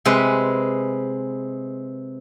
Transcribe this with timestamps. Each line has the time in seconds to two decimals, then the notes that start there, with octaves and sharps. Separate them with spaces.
0.05 C3 G#3 B4